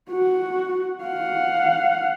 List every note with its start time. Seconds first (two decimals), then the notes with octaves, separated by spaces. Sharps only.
0.11 F#4
1.04 F5 F#5